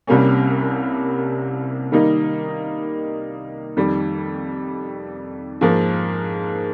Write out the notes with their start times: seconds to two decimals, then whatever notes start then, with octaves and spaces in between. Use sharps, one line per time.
0.07 C2 C3 G3 A#3 C#4
1.92 D#3 G3 A#3 D#4
3.77 F2 D#3 G3
5.61 G#2 F3 A#3